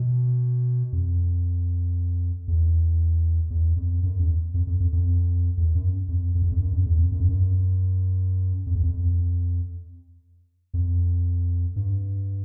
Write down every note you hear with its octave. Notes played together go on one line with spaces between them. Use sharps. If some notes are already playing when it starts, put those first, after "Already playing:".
Already playing: B2
F2
E2
E2
F2
F#2
E2
F2
F2
F2
F2
E2
F#2
F2
F2
E2
F2
F#2
F2
E2
F2
F#2
F2
F#2
F2
E2
F2
F2
G2